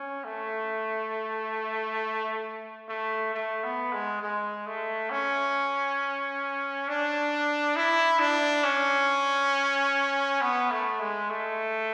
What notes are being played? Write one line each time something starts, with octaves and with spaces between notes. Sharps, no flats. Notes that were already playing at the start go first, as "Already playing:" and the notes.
Already playing: C#4
A3
A3
A3
B3
G#3
G#3
A3
C#4
D4
E4
D4
C#4
B3
A3
G#3
A3